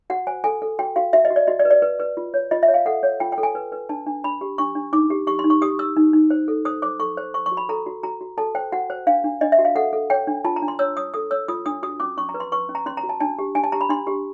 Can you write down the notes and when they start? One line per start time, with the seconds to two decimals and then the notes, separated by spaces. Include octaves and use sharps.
0.10 F#4 F#5
0.27 C5 G#5
0.44 A4 G#5
0.62 A4
0.79 F#4 G5
0.96 F#4 F5
1.13 F#4 E5
1.25 D#5
1.31 F#4
1.36 D5
1.47 F#4 D#5
1.59 D5
1.65 B4
1.71 D5
1.82 B4
2.00 B4
2.17 F4
2.34 C#5
2.51 F4 D#5
2.63 E5
2.68 C#5
2.74 F5
2.86 A4 F#5
3.03 C#5
3.20 F4 G5
3.32 G5
3.38 A4
3.43 G#5
3.55 B4
3.72 B4
3.89 D4 A5
4.07 D4
4.24 D4 B5
4.41 G4
4.58 D4 C#6
4.75 D4
4.93 D#4 D6
5.10 G4
5.27 G4 C#6
5.39 C6
5.44 D#4
5.50 C#6
5.62 G4 D#6
5.79 G4 E6
5.96 D#4
6.13 D#4
6.30 C5
6.48 A4
6.65 C5 D#6
6.82 C5 D6
7.00 A4 C#6
7.17 C5
7.34 C5 C#6
7.46 C#6
7.51 F#4
7.57 B5
7.69 A4 A#5
7.87 F#4
8.03 F#4 A#5
8.21 F#4
8.38 A4 A5
8.55 C5 G5
8.72 F#4 F#5
8.90 C5
9.07 D4 F5
9.24 D4
9.41 D4 D#5
9.52 E5
9.59 F#4
9.65 F5
9.76 A4 F#5
9.93 A4
10.10 C#5 G5
10.27 D4
10.45 F4 A5
10.56 A#5
10.62 D4
10.68 C6
10.79 C#5 E6
10.96 C#5 D#6
11.14 A4 D#6
11.31 C#5 E6
11.48 F4 D#6
11.66 D4 D#6
11.83 F#4 D#6
12.00 C#4 D6
12.18 C#4 C#6
12.29 A#5
12.34 B4
12.40 C6
12.52 B4 C#6
12.69 C#4
12.75 A#5
12.86 C#4 C6
12.97 A#5
13.03 F#4
13.09 A5
13.20 D4 A5
13.39 G4
13.55 D4 G#5
13.64 A5
13.72 G4 A#5
13.81 B5
13.89 D4 C6
14.07 G4